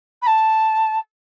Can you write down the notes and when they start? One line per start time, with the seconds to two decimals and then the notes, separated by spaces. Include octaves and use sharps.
0.22 B5
0.26 A5